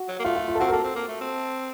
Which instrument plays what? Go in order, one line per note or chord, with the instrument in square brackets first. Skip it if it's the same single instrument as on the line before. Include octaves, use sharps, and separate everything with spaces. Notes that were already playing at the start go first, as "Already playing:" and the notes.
Already playing: [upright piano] F#4
[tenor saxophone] F#3
A#3
[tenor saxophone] A3 [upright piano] F4
[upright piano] F4
F4
A4
[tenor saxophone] C4 [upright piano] F#4
[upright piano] A#4
[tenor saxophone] A#3 [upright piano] A4
[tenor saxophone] C4
A#3
A3
C4